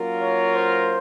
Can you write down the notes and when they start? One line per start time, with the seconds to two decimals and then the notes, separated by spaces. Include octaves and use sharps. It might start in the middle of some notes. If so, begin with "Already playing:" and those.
Already playing: F#3 A#3 C#4 F4 A#4
0.19 C#5
0.55 C5